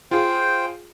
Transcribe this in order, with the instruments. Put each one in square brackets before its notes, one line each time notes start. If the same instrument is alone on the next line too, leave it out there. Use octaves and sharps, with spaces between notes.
[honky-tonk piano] F4 G#4 [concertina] C5 G5